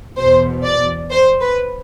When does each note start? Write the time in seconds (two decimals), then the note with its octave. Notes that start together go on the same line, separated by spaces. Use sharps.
0.17 E2 B2 C5
0.64 D5
1.11 C5
1.41 B4